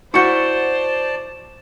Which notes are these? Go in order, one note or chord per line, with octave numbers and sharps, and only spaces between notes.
E4 F#4 C5 D5 A5 C#6 G6 C#7